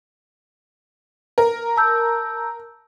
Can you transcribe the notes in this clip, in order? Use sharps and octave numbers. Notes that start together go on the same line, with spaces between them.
A#4
A5 E6 G6